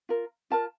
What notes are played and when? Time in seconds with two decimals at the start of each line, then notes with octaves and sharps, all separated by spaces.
0.09 F4 A#4
0.50 F4 A#4 A5